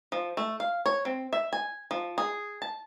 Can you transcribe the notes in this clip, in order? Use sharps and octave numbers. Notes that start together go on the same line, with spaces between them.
F3
A3
F5
C#5
C4
E5
G#5
F3
G#4
A5